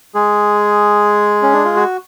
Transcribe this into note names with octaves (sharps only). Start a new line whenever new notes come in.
G#3 G#4
C#4
D4
F4
F#4